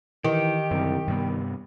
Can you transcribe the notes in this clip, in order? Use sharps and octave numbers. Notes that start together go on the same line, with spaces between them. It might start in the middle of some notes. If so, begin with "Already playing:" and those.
D#3 E3 G4
C2 F#2 D3
G2 C3 G3 B3